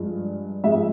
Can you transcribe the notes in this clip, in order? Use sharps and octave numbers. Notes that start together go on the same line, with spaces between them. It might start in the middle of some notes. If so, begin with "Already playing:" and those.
Already playing: G2 F3 G#3
G#2 F3 G#3 E5